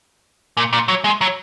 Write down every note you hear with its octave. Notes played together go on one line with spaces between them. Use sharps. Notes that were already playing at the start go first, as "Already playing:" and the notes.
A#2
A#2
F#3
G#3
F#3